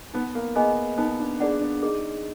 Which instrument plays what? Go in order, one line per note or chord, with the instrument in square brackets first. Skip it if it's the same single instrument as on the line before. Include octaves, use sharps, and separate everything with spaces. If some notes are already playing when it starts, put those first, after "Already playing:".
[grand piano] B3 [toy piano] D#4
[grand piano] A#3
[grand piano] B3 [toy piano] G#4 D#5 G#5
[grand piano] B3 [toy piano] D#4
[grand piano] D4
[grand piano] D4 [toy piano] G#4 D5 F#5
[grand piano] D4
[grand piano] D#4 [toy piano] G#4